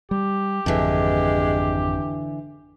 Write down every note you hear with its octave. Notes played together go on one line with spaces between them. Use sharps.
G3 G4
G#1 F2 D3 E3 G#3